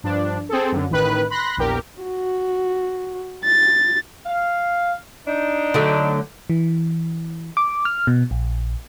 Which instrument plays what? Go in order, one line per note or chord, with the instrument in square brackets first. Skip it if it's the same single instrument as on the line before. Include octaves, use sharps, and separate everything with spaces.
[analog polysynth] G2 F3 D4
C4 G#4 A4
F#2 D3
A1 D#3 B4 F#6
B5 C6 F#6 A#6
A#1 E2 G4 A#4
[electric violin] F#4
A6
[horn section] F5
D4 D#4
[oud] D3 F#3 A3
[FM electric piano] E3
D6
F6
B2
A#1